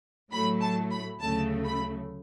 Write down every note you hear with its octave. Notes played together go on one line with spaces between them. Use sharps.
A2 F#3 A3 B5
A5
B5
D2 C#3 F#3 A3 A5
B5